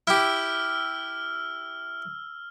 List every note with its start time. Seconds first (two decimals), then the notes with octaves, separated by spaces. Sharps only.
0.07 E4 G4 E6 F6